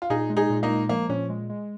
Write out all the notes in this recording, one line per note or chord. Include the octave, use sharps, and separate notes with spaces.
F4
A#2 D#4 G#4
G#3
D#4 G#4
A#2
A#3 D#4
G#3
F3 A#3
A#2 C#4
G#3
G#3